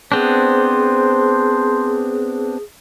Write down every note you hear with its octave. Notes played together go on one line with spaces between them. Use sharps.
B3 C4 D4 G#4 C5